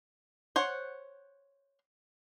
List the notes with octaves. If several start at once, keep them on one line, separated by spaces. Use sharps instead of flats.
C5 C#5 F#5